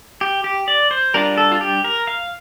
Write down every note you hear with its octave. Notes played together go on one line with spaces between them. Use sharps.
G4
G4
D5
C5
G3 D4 F4 A#4
A4
F4
G4
A#4
F5